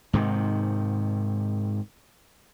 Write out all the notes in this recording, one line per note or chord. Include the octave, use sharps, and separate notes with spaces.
G#2 C3 D#3